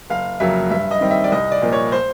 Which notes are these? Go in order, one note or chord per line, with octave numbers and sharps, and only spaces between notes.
F#1 F5
F2 C#3 F#3 A#3 E5
G2 E5
D#5
D#3 G3 C4
E5
D5
C2 D#5
D5
A#2 F3 A#3
C#5
C5